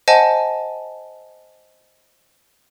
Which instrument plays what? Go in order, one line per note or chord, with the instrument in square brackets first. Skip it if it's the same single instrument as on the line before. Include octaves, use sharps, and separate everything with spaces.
[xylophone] C5 D#5 F#5 G#5 A5